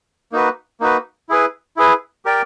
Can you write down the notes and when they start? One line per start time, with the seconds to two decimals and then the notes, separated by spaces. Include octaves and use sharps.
0.32 A#3 D#4 F#4 B4
0.80 A#3 D#4 F#4 B4
1.29 E4 G#4 B4
1.77 E4 G#4 B4
2.25 G4 A#4 D5 G5